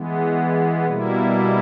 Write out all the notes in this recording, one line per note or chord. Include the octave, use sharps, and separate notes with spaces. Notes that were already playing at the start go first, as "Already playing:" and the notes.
Already playing: E3 G#3 B3
B2 G3 A#3 E4